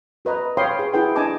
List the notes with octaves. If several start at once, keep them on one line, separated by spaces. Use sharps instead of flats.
F#4 B4 D#5 A#5
C#5 F5 G5 B5 C6 D#6
G#4 B4
E4 F#4 G#4 B4 F#5 G5
D4 D#5 G#5 A5 D6